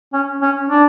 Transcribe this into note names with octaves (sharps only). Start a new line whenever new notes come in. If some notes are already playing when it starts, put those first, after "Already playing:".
C#4
C#4
D4